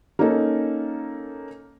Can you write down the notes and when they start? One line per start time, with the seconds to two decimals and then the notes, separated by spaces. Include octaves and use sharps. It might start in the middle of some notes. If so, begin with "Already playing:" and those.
0.19 A#3 C#4 D#4 A4